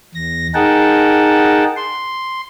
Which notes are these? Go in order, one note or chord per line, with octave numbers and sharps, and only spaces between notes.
E2 A#6
D#4 G#4 A#4 F#5 G5 A5
C6